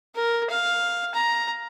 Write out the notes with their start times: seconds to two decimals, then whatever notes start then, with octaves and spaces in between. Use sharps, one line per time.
0.15 A#4
0.50 F5
1.14 A#5